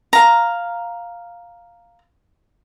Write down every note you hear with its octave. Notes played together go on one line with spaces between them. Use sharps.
F5 A#5